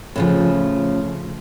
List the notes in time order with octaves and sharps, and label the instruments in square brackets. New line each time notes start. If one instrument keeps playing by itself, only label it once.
[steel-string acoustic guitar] A2 C#3 F3